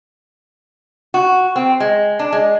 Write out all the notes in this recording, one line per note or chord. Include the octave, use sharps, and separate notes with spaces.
F#4
C4
G#3
D4
G#3